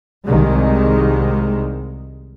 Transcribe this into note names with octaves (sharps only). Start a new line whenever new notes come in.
C2 D#3 G#3